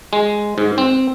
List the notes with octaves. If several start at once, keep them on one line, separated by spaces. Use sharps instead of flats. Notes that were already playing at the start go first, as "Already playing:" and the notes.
G#3
G#2
C4